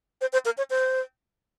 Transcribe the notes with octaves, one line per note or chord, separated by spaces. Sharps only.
C5
C5
A#4
C#5
C5